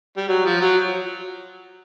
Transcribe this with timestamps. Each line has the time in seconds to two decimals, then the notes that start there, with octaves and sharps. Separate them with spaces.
0.17 G3
0.28 F#3
0.45 F3
0.61 F#3